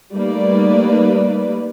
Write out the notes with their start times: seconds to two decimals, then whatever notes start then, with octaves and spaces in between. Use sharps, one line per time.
0.14 G3 A3 A#3 D#4 B4 D5